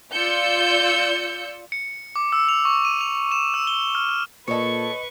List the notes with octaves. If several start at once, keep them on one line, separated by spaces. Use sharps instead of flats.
F4 D5 E6 G6 C#7
C#7
D6
E6
F7
C#6
D#7
F7
E7
E6
G7
F6
F6
A#2 A4 B4 C#5 D#5 C#6 C#7